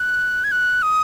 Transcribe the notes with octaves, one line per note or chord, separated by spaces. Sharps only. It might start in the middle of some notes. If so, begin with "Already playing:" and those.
Already playing: F#6
G#6
F#6
D#6